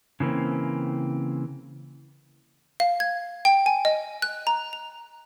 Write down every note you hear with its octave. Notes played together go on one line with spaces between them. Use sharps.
C#3 E3 A#3 C4
F5
G#6
G5
G#5
D#5
F#6
A#5
F7